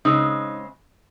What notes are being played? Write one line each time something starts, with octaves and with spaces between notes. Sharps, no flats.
C#3 G#3 C4 D#4